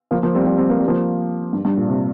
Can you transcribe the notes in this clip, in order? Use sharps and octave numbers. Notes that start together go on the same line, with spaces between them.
F3 A#3
F3 A#3
G3 C4
G3 C4
G3 C4
A#3
G3
F3 A#3
G2
G2
A#2
C3